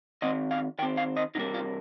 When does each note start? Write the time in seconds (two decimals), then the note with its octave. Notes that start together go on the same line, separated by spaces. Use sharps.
0.22 D#3 C4 D#5
0.51 F5
0.79 D#3 G5
0.83 C4
0.97 F5
1.17 D#5
1.35 C3 G3 A#3 D#4
1.54 F4